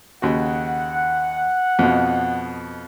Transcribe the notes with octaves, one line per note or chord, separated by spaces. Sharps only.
D#2 C#3 F#4 F#5
F2 B2